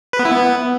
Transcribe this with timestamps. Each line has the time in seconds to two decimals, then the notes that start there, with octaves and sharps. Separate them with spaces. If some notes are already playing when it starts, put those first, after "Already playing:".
0.13 B4
0.19 B3
0.25 E4
0.31 B3